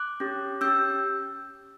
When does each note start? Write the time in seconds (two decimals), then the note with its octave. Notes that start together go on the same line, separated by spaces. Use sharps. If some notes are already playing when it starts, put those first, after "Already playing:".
Already playing: D6 F#6
0.20 C#4 G4
0.61 C#4 G4 E6 G6